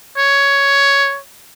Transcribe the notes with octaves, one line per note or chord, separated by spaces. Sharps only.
C#5